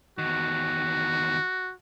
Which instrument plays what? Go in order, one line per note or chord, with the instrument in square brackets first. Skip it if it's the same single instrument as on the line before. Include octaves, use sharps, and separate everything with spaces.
[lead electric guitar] E2 D#3 [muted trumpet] F#4